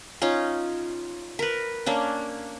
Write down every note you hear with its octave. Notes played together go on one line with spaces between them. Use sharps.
C#4 D#4 F4
A#4 B4
A#3 C#4 D4